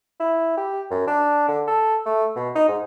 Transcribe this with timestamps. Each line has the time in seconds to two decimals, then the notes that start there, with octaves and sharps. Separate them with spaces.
0.20 E4
0.57 G4
0.91 F#2
1.08 D4
1.48 D3
1.67 A4
2.06 A3
2.36 B2
2.55 D#4
2.68 G#2